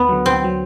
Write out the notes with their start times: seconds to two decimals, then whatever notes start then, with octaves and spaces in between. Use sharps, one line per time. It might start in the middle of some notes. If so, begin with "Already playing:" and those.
Already playing: D2 B3
0.09 D3 F#3
0.26 D2 C4
0.43 D3 F#3